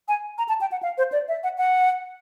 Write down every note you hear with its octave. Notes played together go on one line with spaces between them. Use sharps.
G#5
A#5
A5
G5
F#5
F5
C5
D5
E5
F#5
F#5